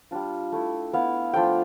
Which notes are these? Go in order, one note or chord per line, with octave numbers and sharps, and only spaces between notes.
G3 D4 F4
A3 E4
B3 E4 F5
F3 A3 D4 F4 G5